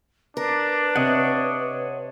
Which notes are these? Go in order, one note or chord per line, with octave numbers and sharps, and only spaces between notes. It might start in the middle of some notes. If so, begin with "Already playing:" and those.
D4 A#4 B4
C3 C#5 D#5 F#5